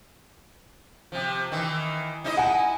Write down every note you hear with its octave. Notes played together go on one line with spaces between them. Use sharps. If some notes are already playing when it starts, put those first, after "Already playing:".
C3 F3
D#3 E3
D#4 E4 D#5
F#5 G#5